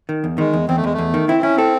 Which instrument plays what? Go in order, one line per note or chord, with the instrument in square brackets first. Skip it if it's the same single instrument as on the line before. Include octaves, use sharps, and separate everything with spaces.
[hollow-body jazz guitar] D#3
E2
[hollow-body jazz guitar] D#3 [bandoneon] G#3
[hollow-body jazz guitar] E2
[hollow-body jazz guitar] E2 [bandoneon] C4
[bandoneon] A3
[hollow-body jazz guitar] E2 [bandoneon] G#3
[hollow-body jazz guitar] E2 [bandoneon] A3
[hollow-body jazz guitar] D#3
[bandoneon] C4 [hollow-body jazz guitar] E4
[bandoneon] C#4 [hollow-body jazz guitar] E4
[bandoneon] C4 [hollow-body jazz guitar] A4